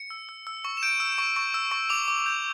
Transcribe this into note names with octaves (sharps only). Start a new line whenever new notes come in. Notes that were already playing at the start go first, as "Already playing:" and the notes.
Already playing: C#7
E6
E6
E6
C#6
E7
G6 D7
E6
C#6
C#6
E6
C#6
D6 F7
D6
G6